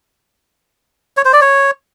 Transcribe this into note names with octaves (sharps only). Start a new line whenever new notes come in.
C#5
C5
D5
C#5